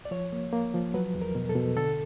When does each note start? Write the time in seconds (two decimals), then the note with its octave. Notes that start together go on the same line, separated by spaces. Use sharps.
0.05 D5
0.11 F3 C#5
0.32 A#3
0.53 A#3
0.74 F3
0.94 F#3 B4
1.15 E2
1.22 A#4
1.35 B2
1.49 A4
1.56 B2
1.77 D3 A4